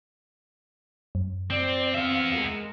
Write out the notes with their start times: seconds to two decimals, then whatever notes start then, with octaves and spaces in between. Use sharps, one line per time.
1.15 F#2
1.50 C4 C5 D5
1.94 B3 C4 E5 F5
2.35 G#3 A#4